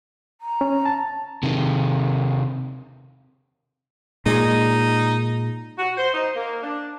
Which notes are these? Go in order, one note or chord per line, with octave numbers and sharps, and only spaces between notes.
A#5
C#4
A5
C3 D#3
A#2 G#3 D#4
F#4
C5
D#4
A#3
D4